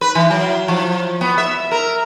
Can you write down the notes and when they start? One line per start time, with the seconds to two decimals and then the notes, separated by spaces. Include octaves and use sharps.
0.01 B4
0.15 E3
0.31 F#3
0.68 F3
1.21 B3
1.38 E5
1.71 A#4